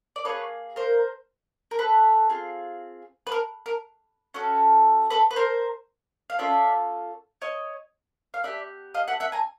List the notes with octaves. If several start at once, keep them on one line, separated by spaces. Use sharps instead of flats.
D5
A#3 D#4 G#4 B4 C#5
A#4 C5
A#4
A4 B4
C4 F4 G#4
B4
A#4
A#4
C#4 F#4 A4
A4 B4
B4
A#4 C5
F5
C#4 F4 A4 D5 E5
C#5 D#5
F5
B3 D#4 G4 D5 E5
D#5 F5
E5 F#5
E5 F#5
G#5 A#5